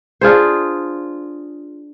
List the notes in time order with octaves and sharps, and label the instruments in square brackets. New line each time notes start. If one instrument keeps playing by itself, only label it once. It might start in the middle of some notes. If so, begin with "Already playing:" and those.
[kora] D4 F4 G#4 C5